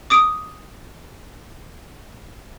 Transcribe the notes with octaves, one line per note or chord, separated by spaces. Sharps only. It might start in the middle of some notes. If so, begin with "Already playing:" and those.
D6 D#6 D7